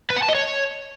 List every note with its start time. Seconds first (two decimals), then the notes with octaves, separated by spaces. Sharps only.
0.10 B4
0.16 F#5
0.22 A5
0.29 D#5
0.35 C#5